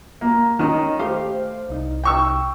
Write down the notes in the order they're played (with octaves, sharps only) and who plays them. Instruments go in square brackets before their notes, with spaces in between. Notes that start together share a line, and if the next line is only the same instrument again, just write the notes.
[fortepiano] A#3
[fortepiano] D#3 [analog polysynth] C#4 D#5
[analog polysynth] A3 C5 F5 [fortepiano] G4
[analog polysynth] C2 D#4
[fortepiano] G5 C#6 E6